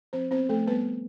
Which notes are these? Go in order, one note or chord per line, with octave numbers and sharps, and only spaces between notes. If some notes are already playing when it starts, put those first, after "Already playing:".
F3 C4 C5
B3 C4 C5
F3 A3 A4
G3 B3 B4
B3